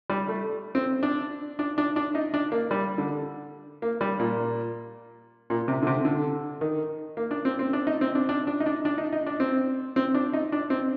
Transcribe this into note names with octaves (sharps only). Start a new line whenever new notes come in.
G3
A3
C4
D4
D4
D4
D4
D#4
D4
A#3
G3
D3
A#3
G3
A#2
A#2
C3
D3
C3
D3
D#3
A#3
D4
C4
C4
D4
D#4
C4
D4
D4
D4
D#4
D4
D4
D#4
D#4
D4
C4
C4
D4
D#4
D4
C4